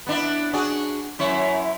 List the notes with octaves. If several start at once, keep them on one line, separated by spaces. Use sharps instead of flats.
B3 D4 E4
D4 F#4 G#4
F#2 E4 C#5